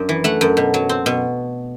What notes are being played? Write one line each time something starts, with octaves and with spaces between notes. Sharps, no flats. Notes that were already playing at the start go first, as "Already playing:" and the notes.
Already playing: F#2 D4
E3
A3 F#5
F#2
B2
F#3
C4
B2